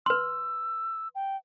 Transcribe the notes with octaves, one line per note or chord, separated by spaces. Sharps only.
B4 C6 E6
G5